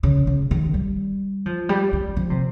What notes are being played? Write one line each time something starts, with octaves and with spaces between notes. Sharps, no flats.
C#3
C#3
D#3
G3
F3
G3
G3
F3
C3